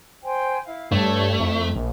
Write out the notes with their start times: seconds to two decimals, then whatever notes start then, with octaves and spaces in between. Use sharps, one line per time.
0.23 C5 G5 G#5
0.65 E4 F5
0.92 G2 A3 C#5 D5 A5
1.40 F2 E4
1.75 A#1